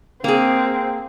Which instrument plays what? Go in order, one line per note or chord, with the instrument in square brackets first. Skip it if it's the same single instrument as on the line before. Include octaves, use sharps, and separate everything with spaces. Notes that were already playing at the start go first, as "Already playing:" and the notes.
[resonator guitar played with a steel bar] A#3 G#4 [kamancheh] C4